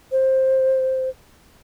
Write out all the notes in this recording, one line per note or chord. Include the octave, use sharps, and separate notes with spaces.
C5